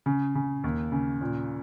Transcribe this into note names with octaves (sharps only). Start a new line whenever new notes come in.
C#3
C#3
D#2
C#3
A#2